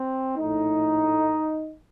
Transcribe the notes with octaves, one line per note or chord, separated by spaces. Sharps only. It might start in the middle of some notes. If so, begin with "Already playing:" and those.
Already playing: C4
A#1 A2 A3 D#4